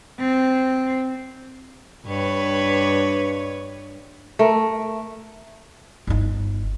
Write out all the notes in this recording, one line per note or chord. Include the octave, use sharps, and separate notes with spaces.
C4
G2 B4 C#5
A3 A#4
G1 D#4